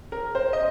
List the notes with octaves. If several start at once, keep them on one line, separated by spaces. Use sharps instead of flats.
A#4
C5
D#5